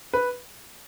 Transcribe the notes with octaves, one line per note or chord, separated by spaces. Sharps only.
B4